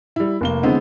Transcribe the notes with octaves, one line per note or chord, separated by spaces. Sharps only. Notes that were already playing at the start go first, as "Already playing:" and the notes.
G3 E4
F1 A#3 G7
D3 E3 G#3 B3 C4